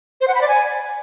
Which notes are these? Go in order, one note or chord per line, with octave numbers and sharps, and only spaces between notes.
C5
F#5
B5
D5
G#5